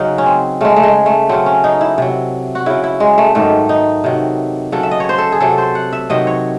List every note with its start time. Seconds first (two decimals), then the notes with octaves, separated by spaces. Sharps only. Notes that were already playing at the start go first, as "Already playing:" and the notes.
Already playing: C#3 F#3 D#4
0.18 C#4
0.26 C4
0.61 C#3 G#3 A3
0.76 A3
0.83 G#3
1.06 A3
1.29 C#3 F#3 C4
1.46 C#4
1.64 D#4
1.81 E4
1.98 C3 F#3
2.55 F#4
2.66 C#3 F#3 E4
2.84 E4
3.00 G#3
3.18 A3
3.35 G#2 D#3 F#3 A3
3.69 D#4
4.04 C3 D#3 F#3
4.72 C#3 F#3 A4
4.83 E5
4.91 D#5
5.00 C#5
5.09 C5
5.18 A4
5.32 G#4
5.40 C3 F#3 A4
5.58 C5
5.75 F#5
5.93 E5
6.10 C3 D#3 F#3 D#5
6.27 C#5